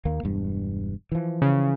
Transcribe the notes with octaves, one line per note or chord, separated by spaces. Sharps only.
D#2 A#3
E1 G2
E3 F3
C#3